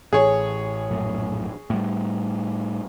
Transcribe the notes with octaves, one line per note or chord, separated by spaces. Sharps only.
A1 G#4 C#5
A#1 F#2 A2
A2 G3